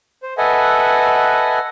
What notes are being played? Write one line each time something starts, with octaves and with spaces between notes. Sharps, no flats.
C5
A4 B4 D#5 E5 F#5 G#5